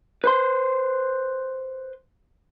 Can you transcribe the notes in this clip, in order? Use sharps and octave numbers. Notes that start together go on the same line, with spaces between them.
B4 C5 C6